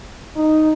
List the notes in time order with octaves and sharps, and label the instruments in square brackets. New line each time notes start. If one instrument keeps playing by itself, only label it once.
[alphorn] D#4